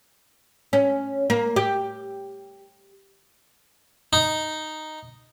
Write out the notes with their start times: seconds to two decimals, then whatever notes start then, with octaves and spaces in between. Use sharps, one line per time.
0.73 C#4
1.30 A#3
1.56 G4
4.13 D#4